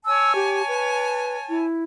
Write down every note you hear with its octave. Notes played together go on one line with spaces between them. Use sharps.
C#5 G#5 A5 E6
G4
B4
E4